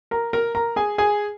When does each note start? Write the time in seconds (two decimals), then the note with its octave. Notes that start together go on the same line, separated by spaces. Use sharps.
0.11 A#4 A#5
0.33 A#4 A#5
0.55 A#4 A#5
0.76 G#4 G#5
0.98 G#4 G#5